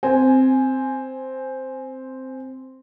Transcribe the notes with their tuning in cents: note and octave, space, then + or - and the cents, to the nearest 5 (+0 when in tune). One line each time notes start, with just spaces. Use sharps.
C4 +0 G#5 +0